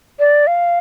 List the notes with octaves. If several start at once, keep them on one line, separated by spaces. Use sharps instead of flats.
D5
F5